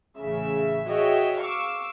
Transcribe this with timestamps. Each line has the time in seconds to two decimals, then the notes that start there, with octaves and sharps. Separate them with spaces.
0.18 A1 C#3 E5
0.87 F#4 G#4 C#5 D#5 E5 G5
1.41 F5 C#6 D6 E6